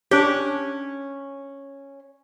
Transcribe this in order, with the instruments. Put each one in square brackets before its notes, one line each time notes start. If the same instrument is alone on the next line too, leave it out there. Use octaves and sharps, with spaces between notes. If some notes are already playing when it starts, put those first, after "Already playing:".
[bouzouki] C#4 [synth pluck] D4 G4